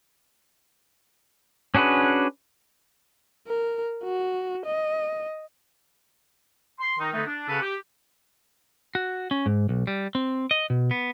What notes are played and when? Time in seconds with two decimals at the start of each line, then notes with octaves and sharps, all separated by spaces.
1.75 C#4 D4 F#4 G#4 B4
3.47 A#4
4.04 F#4
4.66 D#5
6.79 C6
6.98 D#3 D#4
7.13 D3 A3 B3 C4 D#4
7.26 D4
7.48 C#3 C#4 F#4 A4 B4
7.60 G4
8.95 F#4
9.31 C#4
9.46 G#2
9.69 B1
9.87 G3
10.15 C4
10.51 D#5
10.70 B2
10.91 B3